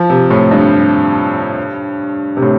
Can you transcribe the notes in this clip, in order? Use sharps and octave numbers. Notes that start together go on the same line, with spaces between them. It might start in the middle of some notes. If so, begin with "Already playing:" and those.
Already playing: F3
C3
A2
G2
C3
A2